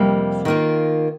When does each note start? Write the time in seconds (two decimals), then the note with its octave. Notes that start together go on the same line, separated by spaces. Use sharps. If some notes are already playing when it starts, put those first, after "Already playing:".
Already playing: F2 C3 G3 A#3
0.45 D#3 A#3 F4